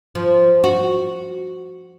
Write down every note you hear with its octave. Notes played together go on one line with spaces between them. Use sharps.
F3
F#4